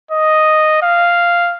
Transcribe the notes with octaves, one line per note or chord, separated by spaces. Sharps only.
D#5
F5